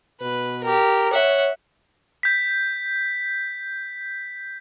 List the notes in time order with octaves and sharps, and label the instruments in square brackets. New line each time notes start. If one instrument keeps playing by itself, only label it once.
[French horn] B2 [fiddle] B4
[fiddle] G4 A#4
[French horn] C#5 [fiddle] E5 F#5
[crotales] G6 B6